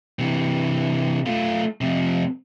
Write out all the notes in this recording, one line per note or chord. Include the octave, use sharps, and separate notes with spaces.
C3 E3
A3 F4
F2 C3